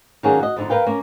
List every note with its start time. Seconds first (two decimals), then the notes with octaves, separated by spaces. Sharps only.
0.23 D#3 F#3 A#3 C#4 D4 G#4
0.39 F#4 D#5
0.56 F2 D3 D#4
0.70 A#4 B4 F5 G5
0.86 A#3 C#4